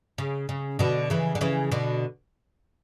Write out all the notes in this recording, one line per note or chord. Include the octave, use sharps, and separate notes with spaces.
C#3
C#3
B2 D3
C#3 E3
D3
C#3 E3
B2 D3